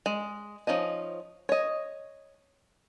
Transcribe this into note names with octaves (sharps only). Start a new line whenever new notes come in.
G#3
F3 C#4 D#4 D#5
C#5 D#5